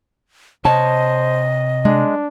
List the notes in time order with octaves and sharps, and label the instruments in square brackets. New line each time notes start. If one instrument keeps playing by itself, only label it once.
[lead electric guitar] C3 C#5 [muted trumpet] C5 [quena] D#5 [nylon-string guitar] A5
[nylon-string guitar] G#3 [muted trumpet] D4